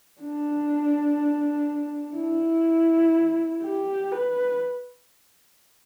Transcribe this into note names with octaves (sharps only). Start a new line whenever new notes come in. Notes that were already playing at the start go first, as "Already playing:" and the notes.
D4
E4
G4
B4